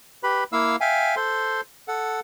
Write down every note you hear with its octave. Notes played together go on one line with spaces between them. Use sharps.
G4 B4 B5
A#3 E4 F5 E6
E5 F5 G5 G#5
A4 C5 C6
A4 F#5